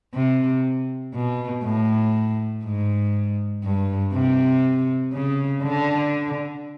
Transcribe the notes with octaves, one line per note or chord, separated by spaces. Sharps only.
C3
B2
A2
G#2
G2
C3
C#3
D3